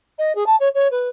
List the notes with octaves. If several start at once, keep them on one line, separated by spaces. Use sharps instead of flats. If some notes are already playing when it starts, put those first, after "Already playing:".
D#5
G#4
A5
C#5
C#5
B4